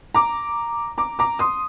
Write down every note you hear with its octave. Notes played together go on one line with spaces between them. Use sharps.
A#5 D6
A#5 D6
A#5 D6
C6 D#6